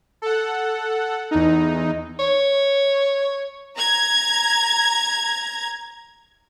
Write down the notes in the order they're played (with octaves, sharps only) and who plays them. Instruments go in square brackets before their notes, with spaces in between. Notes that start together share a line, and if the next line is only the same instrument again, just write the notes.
[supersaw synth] A4 F#5
E2 D#4
[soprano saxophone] C#5
[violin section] A#5 G#6